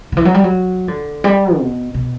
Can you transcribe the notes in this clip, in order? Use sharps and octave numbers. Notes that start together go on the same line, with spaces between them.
D3
E3
F#3
G3
F#3
D3
G3
B2
B2